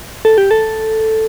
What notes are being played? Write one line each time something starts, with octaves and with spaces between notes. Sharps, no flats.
A4
G4
A4